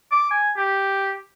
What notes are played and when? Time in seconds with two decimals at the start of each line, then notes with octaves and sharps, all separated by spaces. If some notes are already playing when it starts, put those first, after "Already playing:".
0.11 D6
0.31 G#5
0.56 G4